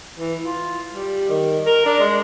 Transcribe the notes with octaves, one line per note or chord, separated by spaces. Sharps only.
E3
F4
G3
D#3
A#4
D4
G#3